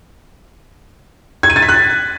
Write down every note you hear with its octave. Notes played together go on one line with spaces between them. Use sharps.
G#6
D#7
A6
B6
F#6